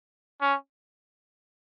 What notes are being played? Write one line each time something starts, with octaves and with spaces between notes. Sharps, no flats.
C#4